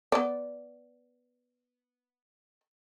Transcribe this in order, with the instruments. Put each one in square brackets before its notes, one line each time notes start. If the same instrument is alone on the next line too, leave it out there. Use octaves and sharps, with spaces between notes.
[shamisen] B3 D5